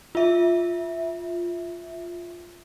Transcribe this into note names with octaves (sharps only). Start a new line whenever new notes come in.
F4 E5